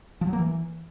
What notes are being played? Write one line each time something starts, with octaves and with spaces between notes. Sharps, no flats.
F3
F#3
A#3
E3